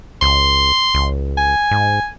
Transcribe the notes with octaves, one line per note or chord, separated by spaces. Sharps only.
C#2 C6
C#2
G#5
G#2